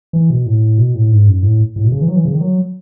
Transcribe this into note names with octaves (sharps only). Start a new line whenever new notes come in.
E3
B2
A2
B2
A2
G#2
F#2
A2
A2
B2
C#3
E3
F#3
E3
C#3
D#3
F#3